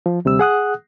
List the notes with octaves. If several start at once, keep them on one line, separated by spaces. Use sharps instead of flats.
F3
D2 C3 G3 E6
G#4 F#5 D#6 F#6